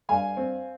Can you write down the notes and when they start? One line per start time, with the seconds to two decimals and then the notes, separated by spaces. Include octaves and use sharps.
0.09 G2 F5 G#5
0.37 C4